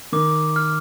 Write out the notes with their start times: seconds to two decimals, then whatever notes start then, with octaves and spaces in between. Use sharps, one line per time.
0.12 D#3 D6
0.56 F6